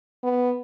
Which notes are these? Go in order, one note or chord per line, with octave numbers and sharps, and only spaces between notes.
B3